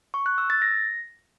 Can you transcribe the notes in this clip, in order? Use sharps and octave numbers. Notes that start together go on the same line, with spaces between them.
C#6
F#6
E6
A6
A#6